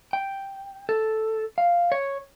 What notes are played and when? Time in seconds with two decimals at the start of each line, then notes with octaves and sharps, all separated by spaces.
0.13 G5
0.89 A4
1.58 F5
1.92 C#5